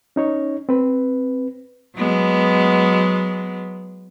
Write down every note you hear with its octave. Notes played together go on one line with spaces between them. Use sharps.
C#4 D#4 C#5
C4 B4
F#3 G#3 B3